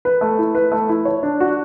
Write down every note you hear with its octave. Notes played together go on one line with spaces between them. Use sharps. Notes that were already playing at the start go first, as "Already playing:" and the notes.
B4
A3
E4
B4
A3
E4
C#5
D4
F#4